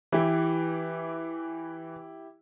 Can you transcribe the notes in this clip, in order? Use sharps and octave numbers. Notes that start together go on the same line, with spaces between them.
E3 E4 G4